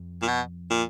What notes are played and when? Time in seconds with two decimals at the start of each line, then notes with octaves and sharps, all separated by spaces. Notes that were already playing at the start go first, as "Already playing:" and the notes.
Already playing: F2
0.22 A#2
0.28 B2
0.70 A#2